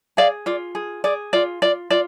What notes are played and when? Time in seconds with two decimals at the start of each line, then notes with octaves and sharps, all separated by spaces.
0.17 G#4 D5 F5
0.46 F4 D5
0.75 G#4
1.04 G#4 D5
1.33 F4 D5
1.62 F4 D5
1.90 F4 D5